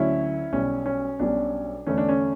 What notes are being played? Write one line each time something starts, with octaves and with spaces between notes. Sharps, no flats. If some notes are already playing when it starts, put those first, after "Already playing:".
Already playing: D2 D3 F#3 C#4 E4
B1 B2 G3 C#4
C#4
B1 B2 G3 C#4 D4
E2 D3 A3 C#4
D4
C#4